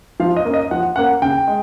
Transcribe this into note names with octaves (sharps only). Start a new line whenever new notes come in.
F3 F5
D#5
A#3 C#4
D#5
F3 F#5
A#3 C#4 F#5
C#3 G5
G#3